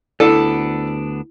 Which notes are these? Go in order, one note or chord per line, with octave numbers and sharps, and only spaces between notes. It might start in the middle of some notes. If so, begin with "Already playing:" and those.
D2 B3 D4 E4 A4